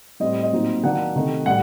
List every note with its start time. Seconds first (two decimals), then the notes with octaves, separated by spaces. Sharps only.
0.20 A2 G3 C4 D#5
0.43 D#5
0.52 A#2 F#3 C4 D#4
0.83 D#3 F#3 A#3 D4 F#5
1.16 C3 D#3 A3
1.46 A2 G3 F#5